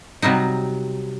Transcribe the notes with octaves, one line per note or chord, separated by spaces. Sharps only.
C3 F#3 G3 D#4